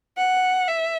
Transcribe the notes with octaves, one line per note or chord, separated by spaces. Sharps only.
F#5
E5